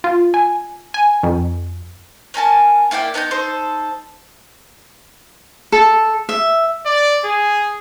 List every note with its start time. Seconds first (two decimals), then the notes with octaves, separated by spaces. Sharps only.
0.04 F4
0.34 G#5
0.94 G#5
1.23 F2
2.34 C#4 A#4 G#5 A5
2.91 A#3 E4 D5 G5
3.14 B3 D#4 A5 G6
3.31 D#4 A4 C5
5.72 A4
6.29 E5
6.86 D5
7.25 G#4